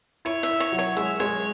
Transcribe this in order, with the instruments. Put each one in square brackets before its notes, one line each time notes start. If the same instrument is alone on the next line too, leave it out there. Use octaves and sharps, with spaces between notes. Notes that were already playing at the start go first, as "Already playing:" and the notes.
[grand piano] E4 [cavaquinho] C#5
[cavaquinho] E5
[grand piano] E4
[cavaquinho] C#5
[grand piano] F#3
[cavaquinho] C#5
[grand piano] G#3 [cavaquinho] E5
[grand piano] G#3 [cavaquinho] C#5